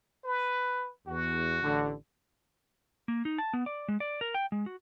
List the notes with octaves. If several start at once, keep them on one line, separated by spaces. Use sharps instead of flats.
B4
E2 F#4
A1 D3
A#3
D#4
A5
B3
D5
G#3
D5
A#4
G5
G#3
F#4